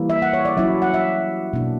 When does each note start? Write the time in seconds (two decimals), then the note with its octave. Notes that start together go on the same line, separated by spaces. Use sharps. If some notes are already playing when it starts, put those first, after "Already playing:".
Already playing: E3 G3 A#3 E4
0.10 E5
0.22 F#5
0.33 C#5
0.45 D5
0.57 F#3 C#4 E4 E5
0.82 F#5
0.94 E5
1.53 B2 A#3 D4